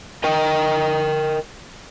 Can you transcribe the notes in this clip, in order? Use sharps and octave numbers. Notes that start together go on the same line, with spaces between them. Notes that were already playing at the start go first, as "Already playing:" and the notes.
A#4 D#5 G5